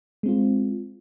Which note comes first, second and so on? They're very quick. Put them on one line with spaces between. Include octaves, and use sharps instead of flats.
G#3 C4 F4